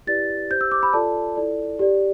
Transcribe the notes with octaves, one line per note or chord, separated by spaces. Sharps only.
E4 G4 B4 D5 A6
G4 C5 G6
E6
D6
B5
F4 A4 D5 A5
E4 A4 D5
G4 D5